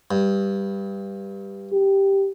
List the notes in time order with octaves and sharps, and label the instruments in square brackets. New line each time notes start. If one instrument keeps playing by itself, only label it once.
[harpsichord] G2
[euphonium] G4